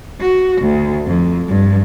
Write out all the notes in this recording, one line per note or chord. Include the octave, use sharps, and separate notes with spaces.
F#4
D2
F2
G2